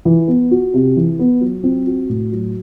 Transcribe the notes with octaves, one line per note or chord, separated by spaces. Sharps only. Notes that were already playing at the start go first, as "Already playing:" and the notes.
E3
B3
F#4
C3
E3
B3
F#3
C4
F#4
A2
F#3